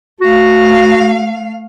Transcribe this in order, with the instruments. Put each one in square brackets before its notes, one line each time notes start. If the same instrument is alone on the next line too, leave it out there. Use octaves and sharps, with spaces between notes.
[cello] A3 F5 [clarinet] F#4